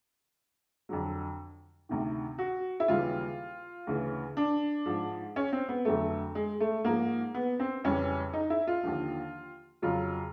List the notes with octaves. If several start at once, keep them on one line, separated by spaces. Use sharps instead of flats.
F2 D3 F#3
D2 C3 D#3
F#4
E4
D#2 C#3 E3 G3 F4
D2 C#3 E3
D4
G#2 F3
C#4
C4
B3
F2 D3 F#3 A3
G#3
A3
G#2 F3 A#3
B3
C4
F2 C#3 E3 G3 C#4
D#4
E4
F4
D#2 D3 F3
F2 C#3 F#3 F4